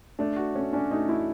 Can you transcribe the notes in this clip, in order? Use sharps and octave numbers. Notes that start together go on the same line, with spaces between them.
A3 D4
F#4
A3 C#4
C#4 D4
A3 D#4
E4 F#4